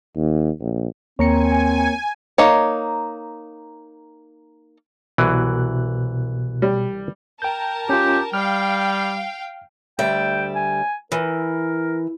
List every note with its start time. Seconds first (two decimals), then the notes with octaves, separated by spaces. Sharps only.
0.17 D#2
0.61 A#1
1.19 D#2 A#3 C4 A#4 C#5 G#5 A#5 C#7
2.38 A#3 D#4 C#5
5.18 C2 B2 E3 F#3 F#6
6.62 G3
7.42 A#4 G5 A5 G6
7.89 C#4 F4 G4
8.34 G3 F5 G5 F6
9.99 D2 G3 E5 G5
10.55 G#5
11.12 E3 A#4